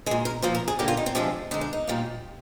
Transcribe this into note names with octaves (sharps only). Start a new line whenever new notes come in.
A#2 G#3 G#4
A#4
A#2 F3 A#3 C5
A#4
G#4
D3 G3 A#3 G4
F4
D#4
C4
C3 F3 G#3 D4
D3 G#3 D#4
D4
D#4
A#2 G3 A#3